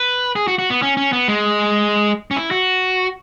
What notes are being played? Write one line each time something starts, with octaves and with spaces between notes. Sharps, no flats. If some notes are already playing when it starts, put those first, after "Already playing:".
Already playing: B4
G#4
F#4
F#4
B3
C#4
C#4
B3
G#3
C#4
E4
F#4